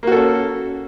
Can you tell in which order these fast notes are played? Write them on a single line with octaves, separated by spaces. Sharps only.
A#3 F#4 A4 C#4